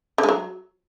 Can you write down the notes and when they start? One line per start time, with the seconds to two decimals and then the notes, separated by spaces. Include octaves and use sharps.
0.18 D3
0.23 G#3
0.29 F#3